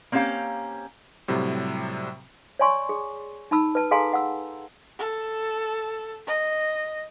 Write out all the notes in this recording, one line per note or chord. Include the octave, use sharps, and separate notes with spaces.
A#3 C4 C#4 G4 F5 A#5
A2 C3 F#3 G3
C#5 D5 G#5 C6 C#6
G#4
D#4 A5 B5 E6
B4 A5
G#4 A4 F5 G#5 A#5 C6
F#5 E6
A4
D#5